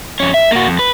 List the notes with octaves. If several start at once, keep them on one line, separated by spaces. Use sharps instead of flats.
F2 C#4
E5
A#3 F#4
F2
B4